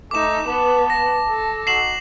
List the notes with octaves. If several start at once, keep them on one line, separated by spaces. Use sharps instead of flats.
A3 D#4 D6 E7
B3 B4 A5
A#6
A4
D#4 F#4 C7 E7 F#7